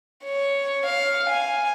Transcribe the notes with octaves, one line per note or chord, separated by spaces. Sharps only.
C#5
F5
G#5